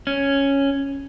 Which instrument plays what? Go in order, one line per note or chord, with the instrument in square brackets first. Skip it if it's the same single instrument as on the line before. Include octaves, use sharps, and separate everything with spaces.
[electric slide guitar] C#4